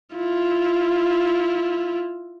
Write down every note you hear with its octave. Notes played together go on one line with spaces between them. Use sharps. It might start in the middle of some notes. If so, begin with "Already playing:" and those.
E4 F4